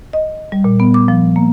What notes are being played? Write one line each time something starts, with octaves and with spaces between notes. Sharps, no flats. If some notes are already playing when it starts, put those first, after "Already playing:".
D#5
G3
A#2
B3
D6
F3
A#3